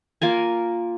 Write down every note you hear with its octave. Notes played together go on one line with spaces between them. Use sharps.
A#3 F4 A#4 G#5